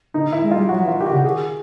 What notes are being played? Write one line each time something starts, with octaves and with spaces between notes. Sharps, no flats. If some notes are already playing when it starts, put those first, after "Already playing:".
D3 D#4
D#3 E4
G#3
G3 F4
F#3 F#4
E3
F4
D#3 G4
C#3 F#4
D#3 G#4